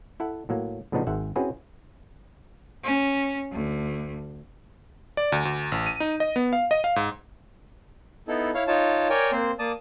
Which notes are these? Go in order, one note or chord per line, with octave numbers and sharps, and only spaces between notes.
E4 A4 F#5
A2 F#3 A#3
A2 C#3 F3 B3 D4 D#4
G#1 G#2 E5 F#5
C4 C#4 E4 F#4 G#4 B4
C#4
D2
D5
D2
D2
A1
D#7
D#4
D#5
B3
F5
D#5
F5
G#2
B3 D#4 E4 A4
E4 C#5 F5
D#4 F4 C#5 A5
A#4 C#5 D5 G5 G#5
A#3 C4 C5
A#3 D5 A5 D#6